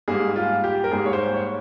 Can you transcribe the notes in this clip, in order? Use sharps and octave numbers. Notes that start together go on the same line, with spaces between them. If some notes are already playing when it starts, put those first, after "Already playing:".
G#2 G3 A#3 G#4
F4
G4
A#4
G#2 G3 A#3 G#4
C#5
C5
C#5